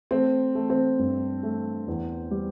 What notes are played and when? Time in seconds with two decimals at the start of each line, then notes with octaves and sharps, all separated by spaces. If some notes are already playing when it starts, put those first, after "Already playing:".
0.11 A3 C4
0.55 A3
0.70 C4
0.99 G2
1.43 A3
1.88 E2
2.31 G3